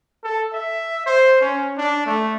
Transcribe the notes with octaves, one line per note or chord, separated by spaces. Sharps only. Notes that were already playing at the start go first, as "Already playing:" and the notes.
A4
E5
C5
C#4
D4
A3